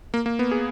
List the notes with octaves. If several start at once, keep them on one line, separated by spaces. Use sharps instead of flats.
A#3
A#3
B3
G#4